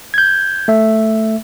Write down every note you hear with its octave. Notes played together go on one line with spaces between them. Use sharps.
G6 G#6
A3 E5